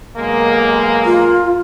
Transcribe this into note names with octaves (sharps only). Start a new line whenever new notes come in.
B1 G#3 A#3
F4